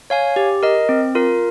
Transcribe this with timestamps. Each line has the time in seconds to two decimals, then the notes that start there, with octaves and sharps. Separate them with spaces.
0.10 C#5 F5 G#5
0.36 G4
0.63 A#4 D#5
0.89 C4
1.15 F4 A#4